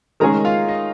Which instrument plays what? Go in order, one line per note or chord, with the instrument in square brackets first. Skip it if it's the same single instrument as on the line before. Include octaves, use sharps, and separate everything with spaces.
[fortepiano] D#3 G#3 C#4 G#4 [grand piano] A#4 A#5
[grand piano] F4 F5
D#4 D#5